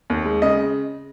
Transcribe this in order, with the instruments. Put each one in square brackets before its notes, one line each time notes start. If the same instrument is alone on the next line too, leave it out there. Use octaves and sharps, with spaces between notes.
[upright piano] D#2
G#3
C#3 D#5